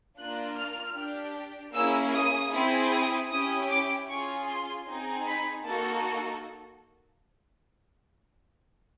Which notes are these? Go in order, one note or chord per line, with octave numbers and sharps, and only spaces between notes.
A#3 D4 F4 F#6
F6
D4 G4
A#3 C#4 E4 G#4 E6
D#6
C4 E4 G#4
D#6
C#4 E4 G4 D#6
D6
C#4 F4 G#4 C#6
C6
C4 D#4 G#4
B5
A#3 D#4 F#4 A4 A5